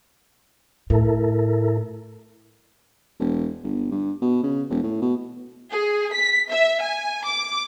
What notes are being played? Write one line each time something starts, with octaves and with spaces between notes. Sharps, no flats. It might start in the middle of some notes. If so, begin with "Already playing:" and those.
A2 E4 A4 A#4
E1
G1
G2
B2
C#3
E1
A2
B2
G#4
B6
E5
G#5
D6